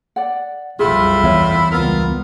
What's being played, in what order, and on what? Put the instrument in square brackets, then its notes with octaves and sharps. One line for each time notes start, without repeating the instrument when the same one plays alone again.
[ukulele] D5 F#5
[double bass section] F1 C2 F#2 [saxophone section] A2 E4 F4 [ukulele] G#4
[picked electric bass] E2 [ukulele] C#5 E5
[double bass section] C#2 G3 B3 [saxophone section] F4 A#4 F5